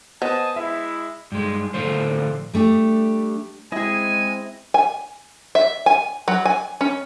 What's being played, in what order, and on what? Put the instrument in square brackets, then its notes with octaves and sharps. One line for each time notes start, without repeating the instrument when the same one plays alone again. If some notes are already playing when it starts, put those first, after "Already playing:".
[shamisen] B3 [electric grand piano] C5 D#5 [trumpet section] G#5 A5 D#6
[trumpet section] G#3 E4 [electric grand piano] E5
[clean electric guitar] G2 G#3
A2 D3 F3 C5
[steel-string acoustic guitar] G3 A3 D4 G4
[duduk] G#3 [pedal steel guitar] C4 D#5 [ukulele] E4 G#4 [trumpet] G#5
[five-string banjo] G#5
E5
G#5
F#3
G#5
C#4